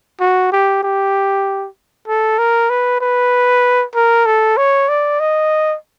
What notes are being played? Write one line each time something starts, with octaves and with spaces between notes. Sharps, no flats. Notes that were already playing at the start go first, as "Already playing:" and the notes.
F#4
G4
G4
A4
A#4
B4
B4
A#4
A4
C#5
D5
D#5